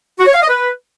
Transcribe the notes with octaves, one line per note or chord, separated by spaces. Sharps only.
F#4
C#5
F5
D#5
B4